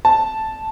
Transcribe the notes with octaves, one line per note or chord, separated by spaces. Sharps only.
A5